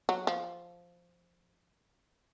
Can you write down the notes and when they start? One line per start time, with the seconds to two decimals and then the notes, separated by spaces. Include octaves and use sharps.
0.09 F#3
0.27 F3